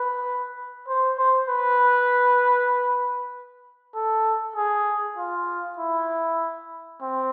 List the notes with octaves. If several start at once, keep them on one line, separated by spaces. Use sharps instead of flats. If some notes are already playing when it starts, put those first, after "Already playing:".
Already playing: B4
C5
C5
B4
A4
G#4
F4
E4
C4